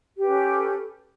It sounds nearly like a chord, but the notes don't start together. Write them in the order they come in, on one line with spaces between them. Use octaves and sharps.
G4 B4 C#4 A4